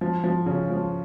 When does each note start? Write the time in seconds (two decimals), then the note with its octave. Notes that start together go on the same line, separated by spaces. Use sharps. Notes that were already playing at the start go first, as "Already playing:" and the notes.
0.01 F3
0.24 F3
0.46 C#3
0.70 F3